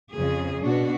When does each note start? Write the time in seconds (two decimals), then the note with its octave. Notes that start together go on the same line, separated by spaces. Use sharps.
0.13 F2 C#3 G#4
0.63 B2 D4 F#4